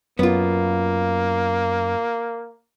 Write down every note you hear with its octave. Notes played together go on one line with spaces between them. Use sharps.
F#2 A#3 B3 F4